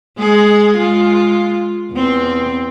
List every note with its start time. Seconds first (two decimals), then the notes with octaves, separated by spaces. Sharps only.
0.18 G#3 G#4
0.78 G#3 F4
1.92 E2 C4